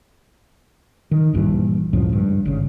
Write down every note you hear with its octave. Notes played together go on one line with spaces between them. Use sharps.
D#3
A#1 G2 D#3 E3
C#2 F#2 A2 F3
G2
G#1 C#3